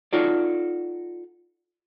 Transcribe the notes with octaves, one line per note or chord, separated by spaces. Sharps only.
D#4 F4 F#4 A4 C#5 D5